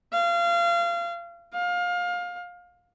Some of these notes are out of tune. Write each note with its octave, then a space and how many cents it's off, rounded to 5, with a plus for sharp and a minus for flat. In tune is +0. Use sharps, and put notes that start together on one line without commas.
F5 -30
F5 +25